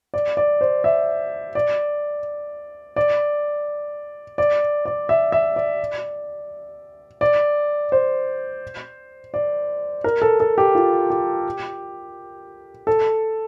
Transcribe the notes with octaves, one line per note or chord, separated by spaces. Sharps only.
D5
D5
C5
E5
D5
D5
D5
D5
E5
E5
D5
D5
C5
D5
A#4
A4
A4
G4
F4
G4
A4